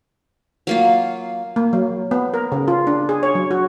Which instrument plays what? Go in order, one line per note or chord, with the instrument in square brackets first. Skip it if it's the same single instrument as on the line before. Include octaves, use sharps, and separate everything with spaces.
[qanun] F#3 A#3 F4
[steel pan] A#3
F#3
B3
A#4
C#3
F4
D4
G#4
C#5
F#3
F#4